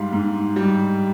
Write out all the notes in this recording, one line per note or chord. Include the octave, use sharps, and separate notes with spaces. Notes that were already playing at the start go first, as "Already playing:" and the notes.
Already playing: G#2 G3 F5 C6
G#2
G3